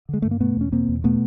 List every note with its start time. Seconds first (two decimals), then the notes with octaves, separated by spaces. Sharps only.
0.09 D3 G#3
0.22 G2 A3
0.31 A#3
0.40 B2 A3 B3
0.57 E2 C#4
0.72 B2 A#3 C4
0.89 E2
1.04 B2 A3 B3